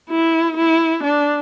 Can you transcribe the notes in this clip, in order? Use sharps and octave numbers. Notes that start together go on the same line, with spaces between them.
E4
E4
D4